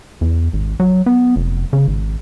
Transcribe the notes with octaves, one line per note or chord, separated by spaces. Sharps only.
E2
G#1
F#3
B3
F1
C#3
G#1